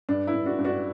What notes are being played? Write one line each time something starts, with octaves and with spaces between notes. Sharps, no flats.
G2 D4
E4
G2
D4 F#4
G2
D4 F#4